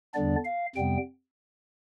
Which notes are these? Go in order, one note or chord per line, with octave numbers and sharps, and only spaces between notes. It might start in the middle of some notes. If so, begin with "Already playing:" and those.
E2 D3 G3 B3 D4 D5
F5
F2 C3 G3 B3 G5